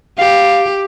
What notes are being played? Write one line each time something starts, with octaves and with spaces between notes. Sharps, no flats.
G4 F5